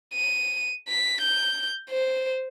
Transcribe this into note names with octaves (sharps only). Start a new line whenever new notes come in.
D#7
B6
G6
C5